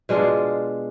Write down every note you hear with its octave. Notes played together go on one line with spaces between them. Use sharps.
B2 G#3 D4 F4